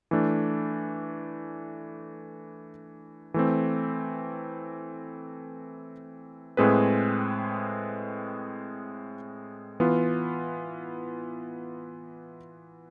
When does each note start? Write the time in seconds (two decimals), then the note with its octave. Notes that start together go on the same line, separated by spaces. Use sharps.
0.11 E3 A3 D4
3.34 E3 A3 C4
6.57 A2 G#3 C4 G#4 B4
9.80 E3 B3 F4